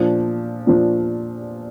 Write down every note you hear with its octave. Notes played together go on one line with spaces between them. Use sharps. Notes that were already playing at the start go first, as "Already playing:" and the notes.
Already playing: A#2 F3 D4
A#2 F3 D4